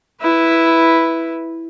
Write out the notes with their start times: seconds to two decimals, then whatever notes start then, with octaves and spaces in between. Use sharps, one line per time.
0.21 E4 B4